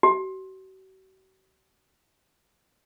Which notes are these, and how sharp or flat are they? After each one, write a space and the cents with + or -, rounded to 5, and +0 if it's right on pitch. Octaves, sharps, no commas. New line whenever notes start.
F#4 +45